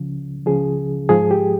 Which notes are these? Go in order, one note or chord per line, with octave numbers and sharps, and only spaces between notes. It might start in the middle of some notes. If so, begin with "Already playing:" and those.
Already playing: C#2 C#3 F3
C#2 C#3 F3 G#4
G#2 F3 G#4
G4